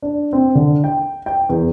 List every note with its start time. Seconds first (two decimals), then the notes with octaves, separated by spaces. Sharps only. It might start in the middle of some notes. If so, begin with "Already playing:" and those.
0.02 D4
0.33 C4
0.55 D3
0.84 G5
1.26 G5
1.49 E2